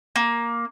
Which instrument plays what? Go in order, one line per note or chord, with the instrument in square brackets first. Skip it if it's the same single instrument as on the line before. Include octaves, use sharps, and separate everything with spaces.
[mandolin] A#3